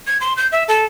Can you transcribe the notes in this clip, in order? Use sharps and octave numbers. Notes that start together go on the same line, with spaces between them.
G#6
C6
G6
E5
A4